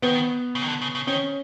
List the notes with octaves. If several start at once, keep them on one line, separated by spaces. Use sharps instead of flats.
D#3 B3
C#3
D#3
D3
C#3
C#3
D#3 C#4